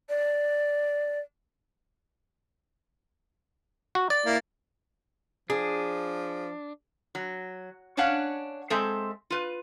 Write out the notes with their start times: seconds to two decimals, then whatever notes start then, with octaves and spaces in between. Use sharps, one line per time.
0.09 D5
3.95 F#4
4.10 D5 A6
4.26 A#3 E4
5.50 F3 D4 G#4
7.15 F#3
7.97 C#4 D4 C#5 F5 F#5
8.70 G#3 C4 A4 C5 E5
9.30 F4 B4